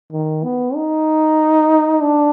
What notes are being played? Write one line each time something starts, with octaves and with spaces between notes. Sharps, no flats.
D#3
B3
D#4
D4